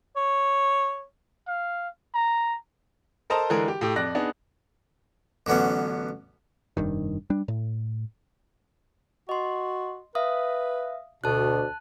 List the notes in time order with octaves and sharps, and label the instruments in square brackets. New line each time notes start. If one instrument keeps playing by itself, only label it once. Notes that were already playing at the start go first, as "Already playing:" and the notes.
[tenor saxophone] C#5
[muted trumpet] F5
A#5
[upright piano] A4 A#4 C5 D#5 A5 A#5
D3 E3 G#3 G#4 A#4
G4
A2 G4
F2 D5 F#6 A#6
B3 D4 D#4 G#4
[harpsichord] A1 D3 F#3 B3 C#4
[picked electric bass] F1 G2 D#3
G3 D4
A2
[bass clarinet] F#4 [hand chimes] D#5 C6
[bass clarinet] B4 [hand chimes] E5 F5 D#6
[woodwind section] D2 [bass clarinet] B2 [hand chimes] A5 F#6